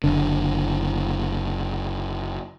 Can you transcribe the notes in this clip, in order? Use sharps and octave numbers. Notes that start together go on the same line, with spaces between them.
F#1 D3